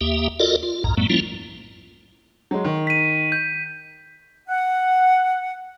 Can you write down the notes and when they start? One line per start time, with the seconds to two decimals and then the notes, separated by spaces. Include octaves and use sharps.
0.01 D#2 A#3 G4 E5
0.40 F4 F#4 A4 A#4 D5 D#5
0.63 F4
0.84 B1 F2 G#2 A#5
0.97 F#2 A2 G3 A3 B3
1.10 F3 G3 A#3 C#4 E4 F4
2.51 F#3 G#3
2.65 D#3
2.87 B6 D#7
3.32 G6
4.49 F#5